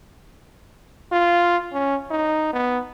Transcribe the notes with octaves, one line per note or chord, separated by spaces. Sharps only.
F4
C#4
D#4
B3